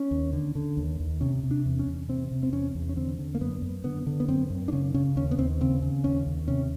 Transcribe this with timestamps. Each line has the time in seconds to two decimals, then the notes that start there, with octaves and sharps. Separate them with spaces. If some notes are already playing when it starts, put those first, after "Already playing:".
Already playing: C#4
0.11 D#2
0.33 D3
0.55 D3
0.77 D#2
1.00 D#2
1.21 C3 C#4
1.43 C3
1.51 D4
1.66 E2
1.79 C#4
1.86 E2
2.08 C3 C4
2.31 C3
2.43 C4
2.52 E2 C#4
2.75 E2
2.89 C#4
2.97 D3 C4
3.19 D3
3.35 A#3
3.41 F#2 B3
3.62 F#2
3.84 D3 B3
4.06 D3
4.20 B3
4.28 F#2 C4
4.50 F#2
4.68 D4
4.72 C#3 C#4
4.94 C#3 C#4
5.16 D#2 C#4
5.31 B3
5.38 D#2 C4
5.61 C#3 C4
5.82 C#3
6.04 D#2 C#4
6.26 D#2
6.48 C3 C#4